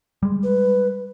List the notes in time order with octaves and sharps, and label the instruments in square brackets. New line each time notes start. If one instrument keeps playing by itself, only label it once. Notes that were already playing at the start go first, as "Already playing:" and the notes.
[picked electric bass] G3 G#3
[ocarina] B4